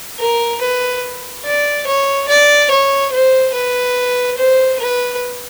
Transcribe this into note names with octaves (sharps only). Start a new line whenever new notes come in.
A#4
B4
D5
C#5
D5
C#5
C5
B4
C5
B4